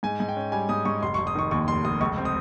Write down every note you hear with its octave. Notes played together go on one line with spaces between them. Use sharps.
G#2 G#5
G#2
G5
C#4
G3 G#5
G#2 D#6
G#2 C#6
F1 C6
C#6
F1
D#6
D#3 C#6
D#2 C#6
F1 C6
F1 D#6
C#2 C#6
C4
D#6